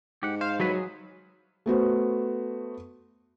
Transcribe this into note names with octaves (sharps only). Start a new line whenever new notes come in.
G#2 G4 F#5
C5 F5
E3 F#3 G3 B4
G#4
A3 B3 F#4 C5